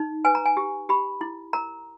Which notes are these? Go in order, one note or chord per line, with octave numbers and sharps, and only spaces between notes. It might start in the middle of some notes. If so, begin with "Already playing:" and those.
Already playing: D#4
B4 G#5
A#5
G#5
G4
G4 B5
E4
A#4 A#5